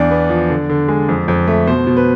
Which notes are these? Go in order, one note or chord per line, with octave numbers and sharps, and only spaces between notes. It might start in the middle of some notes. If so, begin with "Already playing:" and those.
Already playing: E2 D4 D5
B3
F3
D3
D3
G#3
F2
F2
A3
B2 C5
B2
B4